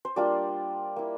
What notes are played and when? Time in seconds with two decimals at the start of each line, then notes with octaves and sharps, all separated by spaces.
0.05 C5
0.16 G3 A#3 D4 F4 D5
0.96 A#3 E4